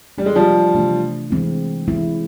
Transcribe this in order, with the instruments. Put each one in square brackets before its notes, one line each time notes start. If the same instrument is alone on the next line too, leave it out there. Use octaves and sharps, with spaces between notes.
[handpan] C3 E3 A3 D4 [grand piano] G3
[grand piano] G#3
F3 G3
[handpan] C3 E3 A3 D4
E3 G#3 C4 E4
E3 G#3 C4 E4